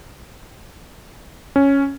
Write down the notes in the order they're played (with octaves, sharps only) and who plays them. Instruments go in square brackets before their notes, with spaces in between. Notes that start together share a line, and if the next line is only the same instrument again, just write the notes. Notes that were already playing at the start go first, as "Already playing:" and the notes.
[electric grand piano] C#4